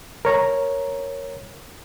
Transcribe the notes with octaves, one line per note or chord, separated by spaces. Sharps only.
A#4 C#5 A#5